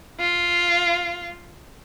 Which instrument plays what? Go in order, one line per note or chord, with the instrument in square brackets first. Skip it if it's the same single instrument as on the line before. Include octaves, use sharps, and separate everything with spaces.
[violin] F4